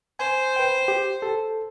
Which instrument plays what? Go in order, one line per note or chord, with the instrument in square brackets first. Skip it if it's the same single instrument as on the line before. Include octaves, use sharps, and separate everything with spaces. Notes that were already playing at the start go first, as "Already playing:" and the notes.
[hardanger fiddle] C5 [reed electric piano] G#5
[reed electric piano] B4 G5
G4
A4